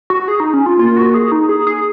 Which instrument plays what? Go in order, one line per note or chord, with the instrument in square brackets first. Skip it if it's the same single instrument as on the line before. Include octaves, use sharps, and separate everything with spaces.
[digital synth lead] F#4
G#4
D#4
C#4
F4
[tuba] A#3 [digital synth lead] F4
[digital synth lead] F#4
G#4
D#4
G#4
G#4